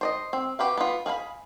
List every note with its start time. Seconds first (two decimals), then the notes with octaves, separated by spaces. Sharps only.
0.01 C5 D5 D#5
0.33 C4
0.59 F#4 G4 B4 F5
0.77 B3 F4
1.06 G#4 F5 G5 B5